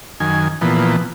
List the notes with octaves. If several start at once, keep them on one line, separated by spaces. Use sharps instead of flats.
F#2 D#3 G#5
A#2 E3 F3 B3